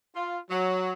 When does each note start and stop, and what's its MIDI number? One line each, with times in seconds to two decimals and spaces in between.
0.15 0.38 65
0.50 0.93 54